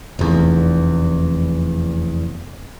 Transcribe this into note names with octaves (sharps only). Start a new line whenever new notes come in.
F1 E2